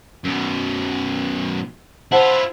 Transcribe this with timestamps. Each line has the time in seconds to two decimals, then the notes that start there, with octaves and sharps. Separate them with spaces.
0.24 F#2 B2
2.12 E4 F4 C5 F#5 A5